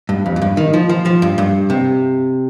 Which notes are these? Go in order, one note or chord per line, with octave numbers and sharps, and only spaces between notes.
G2
F2
F2
G2
D#3
F3
F3
F3
G2
G2
C3